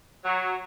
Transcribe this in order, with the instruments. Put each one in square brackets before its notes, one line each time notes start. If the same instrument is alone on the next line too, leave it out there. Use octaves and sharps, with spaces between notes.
[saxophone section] F#3